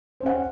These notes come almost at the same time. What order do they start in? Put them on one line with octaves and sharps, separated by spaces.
C5 C#4 F#5